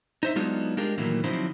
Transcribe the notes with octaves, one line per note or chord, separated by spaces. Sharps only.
D#4 C5 E5
F#3 G#3 B3 D4 D#4 F4
G#3 D4 F4 G4 A#4
A#2 D#3 E3 F#3 A3 A#3
D3 F3 F#3 C4 D#4 E4